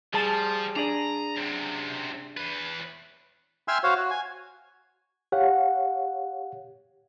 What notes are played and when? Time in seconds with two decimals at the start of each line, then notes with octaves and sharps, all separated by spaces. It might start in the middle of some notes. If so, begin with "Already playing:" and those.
0.14 F3 G3 G#4 A5
0.76 D4 G#4 D5 A#5
1.37 F#2 C3
2.37 E2 B4
3.68 E5 G5 G#5 C6 E6 F6
3.84 F#4 C5 C#5 F5
3.97 F#4
4.11 G#5
5.32 G4 C#5 F5 F#5